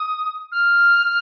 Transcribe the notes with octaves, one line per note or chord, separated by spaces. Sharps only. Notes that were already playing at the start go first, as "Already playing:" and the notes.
Already playing: D#6
F6